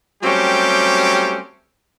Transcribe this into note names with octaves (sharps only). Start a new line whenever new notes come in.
F#3 G3 A3 C4 C#4 G4